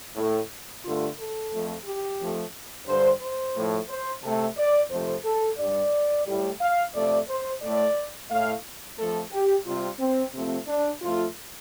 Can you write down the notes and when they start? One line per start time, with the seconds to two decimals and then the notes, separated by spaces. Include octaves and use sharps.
0.16 A2 A3
0.84 G2 D3 A3 F4
1.18 A4
1.52 F2 F3 A3
1.86 G4
2.19 F2 F3 A3
2.87 G2 D3 G3 C5
3.22 C5
3.55 A2 F3 A3
3.89 C5
4.23 C3 A3 A4
4.57 D5
4.90 F2 C3 F3 A3 C5
5.25 A4
5.58 G2 G3 D5
6.27 A2 G3
6.61 F5
6.94 F2 C3 A3 D5
7.28 C5
7.62 A2 A3 D5
8.30 A2 A3 F5
8.98 F2 F3 A3 A4
9.32 G4
9.66 C3 G3 F4
9.99 C4
10.33 C3 F3 A3 C4
10.67 D4
11.01 F2 F3 A3 F4